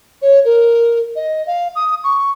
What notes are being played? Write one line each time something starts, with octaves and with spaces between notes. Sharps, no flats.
C#5
A#4
D#5
F5
D#6
C#6